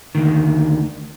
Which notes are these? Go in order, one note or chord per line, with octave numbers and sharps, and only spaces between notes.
D2 D#3